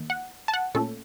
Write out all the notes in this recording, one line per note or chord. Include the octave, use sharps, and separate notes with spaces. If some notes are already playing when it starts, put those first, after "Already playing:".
Already playing: D#3 A#3
F#5
A5
F#5
A#2 A3 C#4 A4